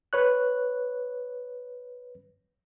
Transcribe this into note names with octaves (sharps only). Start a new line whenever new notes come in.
B4 C#5 F#6